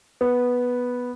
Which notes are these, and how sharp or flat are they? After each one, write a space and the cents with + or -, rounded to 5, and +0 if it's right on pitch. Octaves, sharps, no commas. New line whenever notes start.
B3 -5